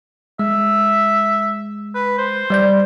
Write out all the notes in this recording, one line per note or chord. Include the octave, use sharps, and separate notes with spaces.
G#3 E5
B4
C5
G3 D5 G6